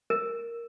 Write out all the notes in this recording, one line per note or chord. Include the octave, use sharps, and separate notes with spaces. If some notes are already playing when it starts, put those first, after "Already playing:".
A#4